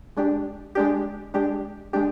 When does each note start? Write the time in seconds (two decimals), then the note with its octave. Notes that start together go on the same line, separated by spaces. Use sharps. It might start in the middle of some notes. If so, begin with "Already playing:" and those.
0.17 G#3 D4 G4
0.75 G#3 D4 G4
1.34 G#3 D4 G4
1.93 G#3 D4 G4